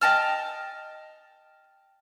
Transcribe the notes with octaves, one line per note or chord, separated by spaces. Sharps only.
D#5 G5 A5 F6